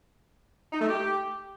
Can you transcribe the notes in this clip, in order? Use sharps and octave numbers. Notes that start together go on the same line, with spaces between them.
D#4
A3
G4